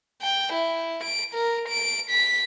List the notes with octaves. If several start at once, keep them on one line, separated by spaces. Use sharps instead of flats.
G5
E4
D7
A#4
D7
B6